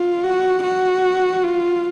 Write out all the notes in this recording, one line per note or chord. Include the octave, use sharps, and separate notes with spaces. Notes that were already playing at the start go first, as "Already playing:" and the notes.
Already playing: F4
F#4
F#4
F4